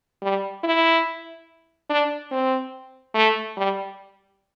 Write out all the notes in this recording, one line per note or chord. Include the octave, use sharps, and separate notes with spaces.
G3
E4
D4
C4
A3
G3